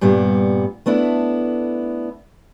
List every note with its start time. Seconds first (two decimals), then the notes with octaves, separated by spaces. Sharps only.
0.01 G2 A#2 G3 B3
0.86 A3 B3 D4 E4